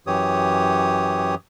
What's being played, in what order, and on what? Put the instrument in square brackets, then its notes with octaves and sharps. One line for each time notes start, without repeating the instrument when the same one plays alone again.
[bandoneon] F#2 E3 G4 C#5 D#6